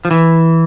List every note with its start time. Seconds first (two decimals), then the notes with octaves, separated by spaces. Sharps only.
0.05 F3
0.11 E3